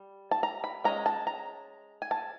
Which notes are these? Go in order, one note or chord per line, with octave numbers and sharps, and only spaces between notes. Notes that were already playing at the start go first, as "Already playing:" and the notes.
Already playing: G3
A5
A#5
B5
F3 G#3 C#4 A#5
A5
A#5
G#5
A5